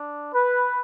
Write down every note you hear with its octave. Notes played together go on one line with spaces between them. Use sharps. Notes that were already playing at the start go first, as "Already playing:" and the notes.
Already playing: D4
B4